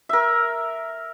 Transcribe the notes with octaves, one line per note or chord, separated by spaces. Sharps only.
A#4 E5